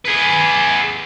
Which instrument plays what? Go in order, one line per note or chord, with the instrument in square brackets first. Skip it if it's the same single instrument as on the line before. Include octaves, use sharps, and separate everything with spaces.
[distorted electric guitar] G#4 B4